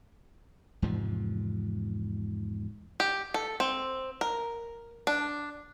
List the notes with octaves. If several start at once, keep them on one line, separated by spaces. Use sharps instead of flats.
E2 G#2 C3 F3
G4
A4
C4
A#4
D4